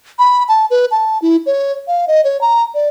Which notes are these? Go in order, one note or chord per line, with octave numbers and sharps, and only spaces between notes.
B5
A5
B4
A5
E4
C#5
F5
D#5
C#5
A#5
D5